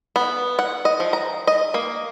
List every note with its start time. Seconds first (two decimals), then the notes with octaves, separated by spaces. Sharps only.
0.16 B3
0.59 F#5
0.85 D#5
1.00 F3
1.13 A#5
1.47 D#5
1.74 A#3